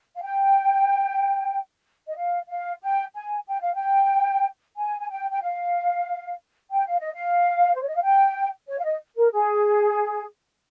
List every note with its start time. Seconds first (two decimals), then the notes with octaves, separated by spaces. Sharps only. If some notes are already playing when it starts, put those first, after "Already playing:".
0.15 F5
0.22 G5
2.07 D#5
2.17 F5
2.49 F5
2.82 G5
3.15 G#5
3.47 G5
3.60 F5
3.73 G5
4.77 G#5
5.00 G#5
5.09 G5
5.31 G5
5.42 F5
6.72 G5
6.87 F5
6.99 D#5
7.13 F5
7.74 C5
7.81 C#5
7.88 D#5
7.95 F5
8.02 G5
8.67 C#5
8.78 F5
8.84 D#5
9.16 A#4
9.32 G#4